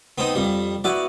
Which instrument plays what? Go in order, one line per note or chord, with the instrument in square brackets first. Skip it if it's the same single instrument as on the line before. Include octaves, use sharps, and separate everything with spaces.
[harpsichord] B3 C4 D#4
F2 G3
[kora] B3 E4 F#4 [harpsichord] D5